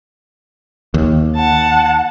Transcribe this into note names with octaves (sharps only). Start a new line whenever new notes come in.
D#2
F#5 A5